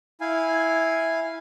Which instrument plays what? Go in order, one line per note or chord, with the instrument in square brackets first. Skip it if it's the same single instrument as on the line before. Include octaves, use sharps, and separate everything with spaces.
[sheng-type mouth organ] E4 F5 G#5